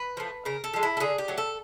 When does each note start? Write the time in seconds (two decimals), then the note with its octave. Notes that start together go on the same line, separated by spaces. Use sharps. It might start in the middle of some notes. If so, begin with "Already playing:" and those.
Already playing: B4
0.17 F3 A3
0.45 C#3 A#4
0.64 A4
0.74 F3 G#3
0.83 E4
0.97 A4
1.00 D3 G#4
1.18 G4
1.28 F#3 A3
1.38 A4